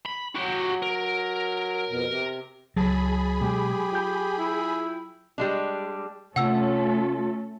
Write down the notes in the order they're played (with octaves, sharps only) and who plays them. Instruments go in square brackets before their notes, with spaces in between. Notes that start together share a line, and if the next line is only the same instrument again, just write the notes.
[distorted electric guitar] B5
[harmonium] F#3 [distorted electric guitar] F#4 G4
[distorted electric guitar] A#4
[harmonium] F2 B2
C3
[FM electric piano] C#2 A5 A6 [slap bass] F#3 [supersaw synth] G#4 B5
[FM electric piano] B2 G#3 [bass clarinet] G4
[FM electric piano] F4 G5 G6
[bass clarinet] E4
[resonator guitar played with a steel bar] G3 G#3 D4
[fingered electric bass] C3 [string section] A3 C#4 A4 [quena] F4 [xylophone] F#5 E6